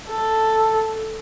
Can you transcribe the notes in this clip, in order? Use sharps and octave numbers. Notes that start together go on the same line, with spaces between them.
A4